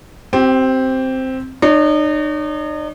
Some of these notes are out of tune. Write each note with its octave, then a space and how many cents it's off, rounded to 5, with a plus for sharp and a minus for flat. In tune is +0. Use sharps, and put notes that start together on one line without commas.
C4 +0 G4 -30 C5 +0
D#4 -40 C#5 +30